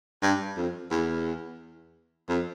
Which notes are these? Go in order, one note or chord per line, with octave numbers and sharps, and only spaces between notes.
G2
F2
E2
F2